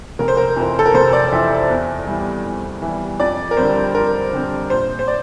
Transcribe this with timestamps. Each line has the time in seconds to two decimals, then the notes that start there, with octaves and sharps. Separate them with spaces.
0.19 F1 A#4
0.28 C5
0.37 A#4
0.56 F2 E3
0.79 A4
0.86 A#4
0.94 F1 C5
1.13 D5
1.32 F2 E3 E5
1.70 E2
2.07 E3 G3
2.45 E2
2.82 E3 G3
3.20 F2 D5
3.51 A#4
3.57 D3 G3 C4 C5
3.95 F2 A#4
4.33 D3 G3 C4
4.70 A#1 C5
4.99 C5
5.08 D5